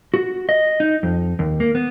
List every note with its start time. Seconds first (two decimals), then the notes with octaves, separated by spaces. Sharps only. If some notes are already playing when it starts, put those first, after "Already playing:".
0.14 F#4
0.49 D#5
0.80 D#4
1.03 F2
1.39 D#2
1.60 A#3
1.75 B3